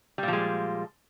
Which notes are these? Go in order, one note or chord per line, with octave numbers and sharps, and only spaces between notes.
A#2 F3 G3 G#3